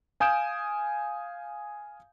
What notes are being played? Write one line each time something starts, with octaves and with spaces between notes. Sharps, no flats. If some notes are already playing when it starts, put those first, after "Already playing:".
F5 G#5 D#6 G6 D7 E7